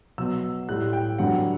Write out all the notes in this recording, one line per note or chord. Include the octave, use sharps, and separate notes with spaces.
B2 F#3 E6
A2 G3 F#6
G5
G2 D3 F#3 F#5